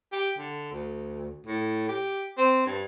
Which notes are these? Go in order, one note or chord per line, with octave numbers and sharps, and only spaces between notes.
G4
D3
D2
A2
G4
C4
G2